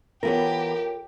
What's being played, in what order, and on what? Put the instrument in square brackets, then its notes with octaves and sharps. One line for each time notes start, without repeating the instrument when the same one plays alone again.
[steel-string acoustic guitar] E3 B3 F#5 [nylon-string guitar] F4 A4 C#5 [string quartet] G4 [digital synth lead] A#4